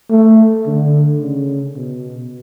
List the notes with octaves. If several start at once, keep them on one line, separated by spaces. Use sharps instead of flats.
A3
D3
C#3
B2